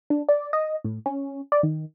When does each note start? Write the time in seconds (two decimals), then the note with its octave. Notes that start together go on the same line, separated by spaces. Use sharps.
0.10 D4
0.29 D5
0.53 D#5
0.84 A2
1.06 C#4
1.52 D5
1.63 D#3